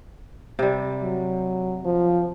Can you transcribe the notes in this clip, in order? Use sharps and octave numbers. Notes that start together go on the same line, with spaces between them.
C3 G3
F#3
F3